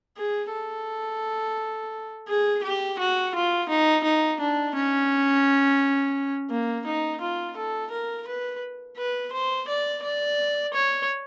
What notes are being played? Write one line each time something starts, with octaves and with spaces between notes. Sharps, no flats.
G#4
A4
G#4
G4
F#4
F4
D#4
D#4
D4
C#4
A#3
D#4
F4
A4
A#4
B4
B4
C5
D5
D5
C#5